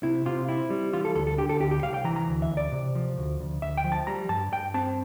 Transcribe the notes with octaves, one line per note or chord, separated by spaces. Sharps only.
C3 E4
C3 F4
C4 E4
G3
E3 F4
A4
D2 A4
A4
D3 G4
A4
D2 G4
G4
C2 F5
G5
E3 A#5
A#5
D2
E5
D2
D5
C3
F3
D2
D2
D2 E5
G5
F3
A5
G3 A#5
G2 A5
G2 G5
C4 A5